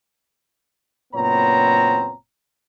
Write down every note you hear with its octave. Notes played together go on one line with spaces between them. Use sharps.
F#1 A#2 B3 C4 C#5 A#5